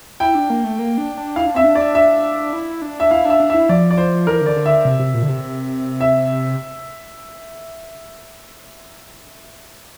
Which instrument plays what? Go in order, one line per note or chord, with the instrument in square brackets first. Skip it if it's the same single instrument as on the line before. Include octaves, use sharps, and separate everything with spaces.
[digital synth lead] E4 [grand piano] G5
[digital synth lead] D4
A#3
A3
A#3
D4
D4
[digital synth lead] E4 [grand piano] F5
[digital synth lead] D4
[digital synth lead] C4 [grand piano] E5
[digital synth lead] D4
[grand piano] D5
E5
[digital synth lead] E4
D4
[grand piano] E5
[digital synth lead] E4 [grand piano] F5
[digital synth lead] D4 [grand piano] E5
[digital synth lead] D4
[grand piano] E5
[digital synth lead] E4
[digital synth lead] F3 [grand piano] D5
[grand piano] D5
C5
[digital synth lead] E3 [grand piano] A#4
[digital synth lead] D3
[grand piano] D5
[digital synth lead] D3
[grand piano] E5
[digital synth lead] C3
C3
A#2
D3
C3
[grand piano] E5